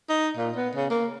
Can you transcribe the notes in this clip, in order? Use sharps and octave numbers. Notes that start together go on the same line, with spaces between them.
D#4
A#2
B3
C#3
A#3